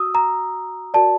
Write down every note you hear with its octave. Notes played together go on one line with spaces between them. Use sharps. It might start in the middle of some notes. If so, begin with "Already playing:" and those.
Already playing: F#4 D#6 E6
A#5
F#4 A#4 D5 A5